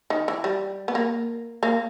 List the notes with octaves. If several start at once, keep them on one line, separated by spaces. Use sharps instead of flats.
D#3
E3
G3
B3
A#3
A#3